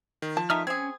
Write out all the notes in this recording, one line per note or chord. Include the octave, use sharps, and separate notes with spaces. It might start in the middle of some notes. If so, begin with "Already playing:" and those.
D#3
F3 A5
D#3 A3 D#4 E5 D#6 F6
C4 C#4 G#4 G#6